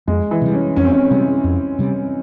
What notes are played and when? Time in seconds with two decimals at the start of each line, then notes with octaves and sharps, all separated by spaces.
0.07 F2 G#3
0.31 E3
0.42 C3 G3
0.53 C#4
0.76 F2 C#4
0.84 C4
0.92 C#4
1.11 C3 G3
1.44 F2
1.79 C3 G3